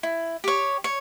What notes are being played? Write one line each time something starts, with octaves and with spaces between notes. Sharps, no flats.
E4
G4 C#5
C#5